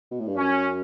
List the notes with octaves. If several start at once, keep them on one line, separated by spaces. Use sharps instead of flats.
B2
A2
G2
F#2 C#4